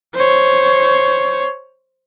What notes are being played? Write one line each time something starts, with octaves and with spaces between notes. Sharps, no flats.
C5 C#5